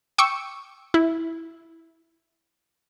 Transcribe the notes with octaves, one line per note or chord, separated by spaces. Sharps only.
G5 C#6 D6 E6 C#7
E4